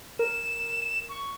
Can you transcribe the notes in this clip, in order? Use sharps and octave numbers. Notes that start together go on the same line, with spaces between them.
A#4 E7
C#6